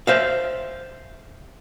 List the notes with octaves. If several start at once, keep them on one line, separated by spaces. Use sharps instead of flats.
C5 E5 F5